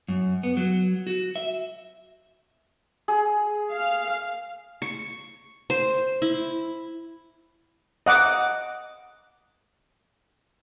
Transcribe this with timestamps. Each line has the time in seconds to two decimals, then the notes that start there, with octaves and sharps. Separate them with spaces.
0.08 F#2
0.43 B3
0.57 F#3
1.07 F#4
1.36 E5
3.08 G#4
3.71 F5
4.82 C#6
5.70 C5
6.22 E4
8.06 D#5 F#5 D6